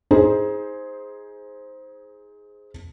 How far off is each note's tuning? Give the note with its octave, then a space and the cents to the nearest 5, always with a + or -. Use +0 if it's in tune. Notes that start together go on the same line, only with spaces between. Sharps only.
D#4 +25 G#4 +0 C5 +0